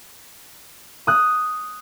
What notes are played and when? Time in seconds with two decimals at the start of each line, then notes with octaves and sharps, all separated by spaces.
1.07 D#6 F#6